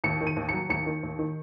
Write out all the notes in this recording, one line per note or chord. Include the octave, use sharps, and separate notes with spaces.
D#2 C#7
D#3
D#7
D#2
F#3 C#7
D#2 C#7
D#3
D#2
D#3